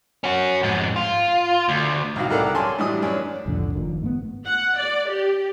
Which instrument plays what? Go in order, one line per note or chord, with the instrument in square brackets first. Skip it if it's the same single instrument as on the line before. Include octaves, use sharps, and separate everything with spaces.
[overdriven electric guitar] C#4 F#4
F2 G#2
F4
D2
[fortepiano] C2 C3 D#4 F#4 F5
C2 A4 A#4 D5 F#5
F#2 G#5 A5 C6 D6
A2 E3 F#3 G3 D4 D#6
F#2 D4 G#5
[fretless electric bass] C2 F2 A2 D3
F#1 D#3 F3
G#2 A3 B3
[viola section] F#5
D5
G4